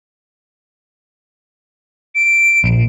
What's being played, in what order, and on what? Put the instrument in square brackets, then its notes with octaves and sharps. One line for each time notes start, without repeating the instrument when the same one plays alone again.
[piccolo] D7
[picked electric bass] A#1